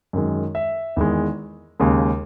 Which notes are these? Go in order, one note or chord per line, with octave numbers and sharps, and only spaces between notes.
F#2 D#3 G#3
E5
E2 D#3 G#3
D#2 C#3 G#3